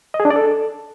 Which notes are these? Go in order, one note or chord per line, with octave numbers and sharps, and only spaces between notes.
D#5
G#4
D4
D5
A4